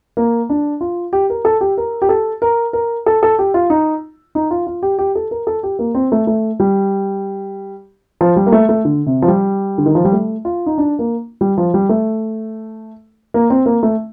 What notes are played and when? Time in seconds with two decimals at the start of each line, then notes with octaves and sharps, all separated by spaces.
0.17 A#3
0.50 D4
0.81 F4
1.13 G4
1.30 A#4
1.45 A4
1.61 G4
1.78 A#4
2.02 G4
2.09 A4
2.42 A#4
2.73 A#4
3.06 A4
3.23 A4
3.39 G4
3.54 F4
3.70 D#4
4.35 D#4
4.51 F4
4.67 F4
4.83 G4
4.99 G4
5.15 A4
5.31 A#4
5.47 A4
5.63 G4
5.79 A#3
5.95 C4
6.12 A3
6.27 A3
6.60 G3
8.21 F3
8.36 G3
8.46 A#3
8.52 A3
8.69 A3
8.85 D3
9.06 C3
9.22 F3
9.28 G3
9.78 D3
9.86 D#3
9.95 F3
10.05 G3
10.12 A3
10.45 F4
10.66 D#4
10.78 D4
10.99 A#3
11.41 G3
11.58 F3
11.74 G3
11.89 A3
13.34 A#3
13.50 C4
13.66 A#3
13.83 A3